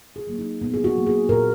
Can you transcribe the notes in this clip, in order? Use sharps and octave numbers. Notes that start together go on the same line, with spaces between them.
G#4
F#3 A#3
D#4
A#2 B3
G#4
F#4
F#3 A#3
G#4
A#2 A#4